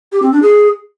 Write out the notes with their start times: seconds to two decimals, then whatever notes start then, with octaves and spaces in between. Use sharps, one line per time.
0.12 G4
0.22 C4
0.32 D4
0.42 G#4